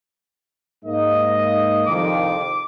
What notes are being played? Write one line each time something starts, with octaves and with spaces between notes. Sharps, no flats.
G#2 A#3 D#5
C2 F2 D#3 D6